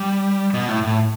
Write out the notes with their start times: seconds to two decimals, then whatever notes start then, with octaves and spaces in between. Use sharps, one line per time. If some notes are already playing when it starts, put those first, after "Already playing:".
Already playing: G3
0.54 B2
0.68 A2
0.83 A2